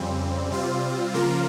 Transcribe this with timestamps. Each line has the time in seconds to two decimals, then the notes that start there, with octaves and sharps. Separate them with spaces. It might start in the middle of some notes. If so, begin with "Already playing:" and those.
Already playing: F2 C#3 G3 C4
0.50 C3 G3 C4 F4
1.14 C#3 F3 A#3 F4 A#4